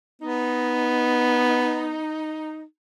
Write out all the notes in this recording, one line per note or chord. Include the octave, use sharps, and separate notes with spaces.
B3 D#4